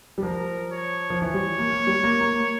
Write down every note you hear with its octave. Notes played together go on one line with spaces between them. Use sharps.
G3
F3 A#4
C#5
F3
E3 C#5
G3
A#3
A#3
G3
A#3
A#3